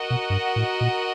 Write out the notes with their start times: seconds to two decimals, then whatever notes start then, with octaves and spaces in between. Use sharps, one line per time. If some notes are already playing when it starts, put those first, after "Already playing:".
Already playing: F#4 A#4 D#5 F#5
0.10 B2
0.30 G2
0.56 A2
0.81 A#2